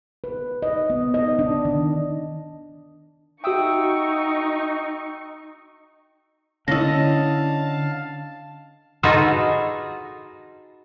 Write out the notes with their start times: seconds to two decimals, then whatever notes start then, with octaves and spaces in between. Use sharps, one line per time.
0.24 B4
0.62 D#5
0.90 B3
1.14 D#5
1.39 D4
1.65 D#3
3.44 D#4 F#4 E5 G5 C#6 D#6 E6
6.68 D3 C#4 E4 D#5 F5 A5 A#6
9.03 D#4 F4 F#4 G#4 A4 B4